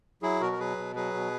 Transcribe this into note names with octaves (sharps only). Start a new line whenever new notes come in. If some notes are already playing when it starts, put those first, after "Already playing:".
F#3 E4 G#4
B2 F#4 A#4
A#4
F#3 G#4 B4
B2
F#3 G#4 B4
B2